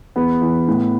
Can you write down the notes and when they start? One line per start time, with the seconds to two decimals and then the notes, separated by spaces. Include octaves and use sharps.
0.16 E2 B3
0.41 E3
0.68 A2